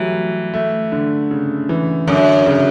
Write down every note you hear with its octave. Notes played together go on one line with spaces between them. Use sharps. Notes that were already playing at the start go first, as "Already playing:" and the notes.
Already playing: E3 F#3 G3 A3
A3
D3
C#3
E3
F#2 D3
C#3